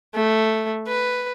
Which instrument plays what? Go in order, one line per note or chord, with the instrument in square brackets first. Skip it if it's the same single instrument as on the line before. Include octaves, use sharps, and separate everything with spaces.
[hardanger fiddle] A3
B4